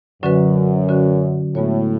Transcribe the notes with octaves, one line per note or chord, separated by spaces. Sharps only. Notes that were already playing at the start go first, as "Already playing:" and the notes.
F#2 D3 F#3 C#4 F#4 B4
D3 F#3 C#4 F#4 B4
A2 G#3 B3 F#4 C#5